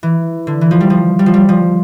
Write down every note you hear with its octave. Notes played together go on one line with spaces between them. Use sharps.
E3
D3
E3
F3
G3
F3
G3
F3
G3
F3